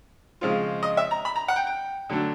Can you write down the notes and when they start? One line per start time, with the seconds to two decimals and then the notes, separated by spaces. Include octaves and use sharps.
0.41 C#3 F3 G#3 C4 F4
0.83 D#5
0.97 E5
1.11 A#5
1.25 B5
1.36 A#5
1.48 F#5
1.56 G5
1.67 G5
2.09 D3 F#3 A3 D4